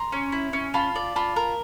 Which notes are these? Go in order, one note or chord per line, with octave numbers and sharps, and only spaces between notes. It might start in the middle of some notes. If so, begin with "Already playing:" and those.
Already playing: A#5 C6
C#4
E4
C#4
F4 A5 B5
D5
F4 A5 B5
A#4